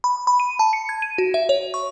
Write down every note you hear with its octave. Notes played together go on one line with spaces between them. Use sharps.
B5
B5
D#7
A5
C#7
G#6
D#7
F#4
E5
C#5
C#6